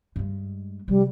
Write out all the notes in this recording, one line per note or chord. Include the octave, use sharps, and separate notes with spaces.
G2 G#3
C3 F3 G3